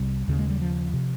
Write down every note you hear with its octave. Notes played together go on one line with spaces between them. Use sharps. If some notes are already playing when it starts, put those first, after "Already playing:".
Already playing: C2 C3 G3
D#2 C#3
G#3
G3
F3
C3